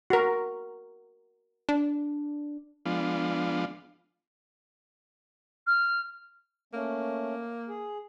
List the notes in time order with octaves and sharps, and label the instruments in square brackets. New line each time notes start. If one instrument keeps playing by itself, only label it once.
[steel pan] F#4 A#4
[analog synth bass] D4
[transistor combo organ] F3 G#3 B3 D4 F4
[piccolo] F6
[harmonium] A3 C#4 [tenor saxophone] A#3
[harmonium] G#4